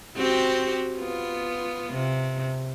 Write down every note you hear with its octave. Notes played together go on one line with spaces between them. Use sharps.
C4 F#4 G4
B3 F4
C3